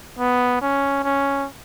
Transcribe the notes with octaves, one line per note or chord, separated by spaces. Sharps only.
B3
C#4
C#4